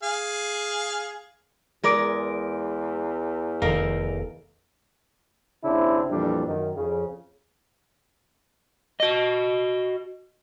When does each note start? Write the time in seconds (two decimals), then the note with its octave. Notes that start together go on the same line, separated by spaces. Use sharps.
0.03 G#4 F5
1.83 E2 G#3 A#4 D5
3.62 F1 D#3 A4 A#4 D#5 F5
5.64 G#1 D#2 C#3 C4 D4 E4
6.11 F2 A#2 E3 G3 D4
6.47 F#2 D#3
6.77 F2 C#3
9.00 F#4 D#5